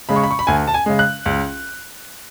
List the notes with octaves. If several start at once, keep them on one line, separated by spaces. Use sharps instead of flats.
C#3 G#3 B5
C#6
B5
C#6
B5
D2 G#5
A5
G#5
C#3 G#3
F#6
C#2